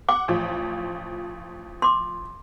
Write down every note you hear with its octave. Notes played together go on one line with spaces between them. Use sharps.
F#5 D6
A1 F3
C6 D6